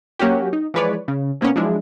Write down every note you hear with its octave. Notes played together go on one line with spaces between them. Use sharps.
F#3 A#3 C#4 F#4 G4
D#4
E3 F3 G#3 B4 C#5 D5
C#3
C3 A#3 B3 C#4
F3 F#3 G#3 D4 E4